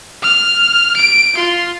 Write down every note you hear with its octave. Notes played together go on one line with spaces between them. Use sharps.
F6
D7
F4 C6